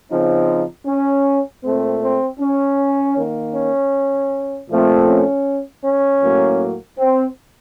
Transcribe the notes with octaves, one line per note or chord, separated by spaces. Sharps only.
C#3 F3 C4 D#4
C#4
A#2 A3 C4
C4
C#4
D#3 A#3
C#4
A#2 F3 A3 C4
C#4
C#4
A2 F#3 A#3
C4